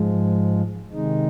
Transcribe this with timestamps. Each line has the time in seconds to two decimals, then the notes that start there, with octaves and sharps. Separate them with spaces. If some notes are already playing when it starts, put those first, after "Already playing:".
Already playing: G#2 F3 G#3
0.92 C3 D#3 G#3 D#4